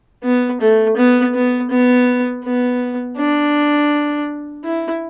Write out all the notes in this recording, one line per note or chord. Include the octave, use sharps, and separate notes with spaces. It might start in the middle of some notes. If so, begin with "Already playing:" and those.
B3
A3
B3
B3
B3
B3
D4
E4